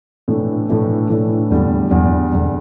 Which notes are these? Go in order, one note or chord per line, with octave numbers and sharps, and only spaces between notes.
A2 E3 A3 D4
A2 E3 A3 D4
A2 E3 A3 D4
E2 D3 G3
E2 D3 G3
E2 D3 G3